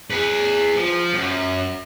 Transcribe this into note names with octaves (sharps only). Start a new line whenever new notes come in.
G#4 B4
F3
F#2